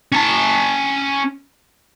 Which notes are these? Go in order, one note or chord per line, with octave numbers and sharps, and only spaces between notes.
C#4 A5